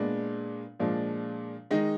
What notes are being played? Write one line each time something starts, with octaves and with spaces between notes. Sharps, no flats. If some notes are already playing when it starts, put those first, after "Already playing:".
Already playing: A#2 G#3 B3 D4
A#2 F3 G#3 D4
D#3 G#3 D#4